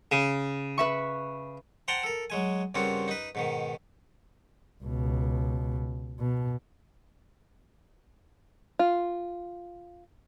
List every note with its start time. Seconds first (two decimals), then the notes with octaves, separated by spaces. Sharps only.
0.11 C#3
0.78 B4 E5 C#6
1.88 C5 F#5 G5 A5 A#5 C6
2.03 A4 A#4
2.30 F#3 G#3 G#5
2.75 G2 C#3 A#3 C4 F4 F#4
3.08 D#4 B4
3.35 G#2 B2 D#3
4.84 C#2 B2
6.19 B2
8.79 F4